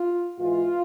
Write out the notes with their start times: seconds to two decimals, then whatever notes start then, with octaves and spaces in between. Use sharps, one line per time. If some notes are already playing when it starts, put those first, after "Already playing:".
Already playing: F4
0.39 G#2 E3 F4